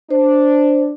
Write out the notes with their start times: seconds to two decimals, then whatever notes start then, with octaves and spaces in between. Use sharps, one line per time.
0.11 D4 C5